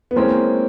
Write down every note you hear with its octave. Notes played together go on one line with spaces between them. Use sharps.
B3
E3 G#3 A#3 C4 C#4